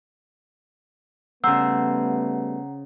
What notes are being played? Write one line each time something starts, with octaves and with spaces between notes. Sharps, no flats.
C#3 G3 A3 B3 C5 F#5 A#5 E6